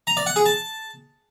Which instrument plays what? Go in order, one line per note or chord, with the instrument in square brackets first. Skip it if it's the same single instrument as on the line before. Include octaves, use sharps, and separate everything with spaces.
[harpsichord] A#5
D5
F#5
G#4
A5